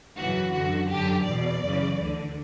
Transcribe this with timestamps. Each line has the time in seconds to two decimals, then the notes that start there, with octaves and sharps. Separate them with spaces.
0.18 F#2 C#3 E3 F#4
0.54 F#2 D3 F#4
0.91 F#2 D3 G4
1.26 E2 B2 D5
1.63 F#2 C#3 E3
1.99 D2 D3